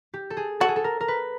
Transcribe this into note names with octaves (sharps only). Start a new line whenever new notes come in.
G4
A4
G#4
F#4 A4
G#4
A4
A#4
A#4
B4